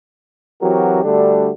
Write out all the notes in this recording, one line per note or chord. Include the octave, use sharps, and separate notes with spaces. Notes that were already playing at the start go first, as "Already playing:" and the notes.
E3 F#3 C4 F#4 G4 A#4
D3 G3 A3 D4 F#4 A4